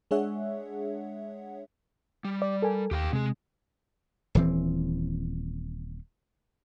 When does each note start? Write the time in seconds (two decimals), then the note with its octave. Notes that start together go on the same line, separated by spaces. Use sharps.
0.11 G#3 D4 G#4 C#5 E5 F#5
2.25 G3
2.42 D5
2.62 A4 A#4 G#5
2.91 D#2 G4 F5 G5
3.13 C3 G#3 G#4
4.35 D#1 E3 C4